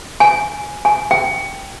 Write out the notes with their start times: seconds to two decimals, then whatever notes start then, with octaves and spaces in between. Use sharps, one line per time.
0.20 G#5
0.85 G#5
1.11 G5